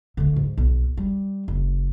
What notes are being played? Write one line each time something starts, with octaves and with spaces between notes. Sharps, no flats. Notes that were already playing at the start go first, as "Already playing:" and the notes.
D3 A3
G#2
B1
G3
F#1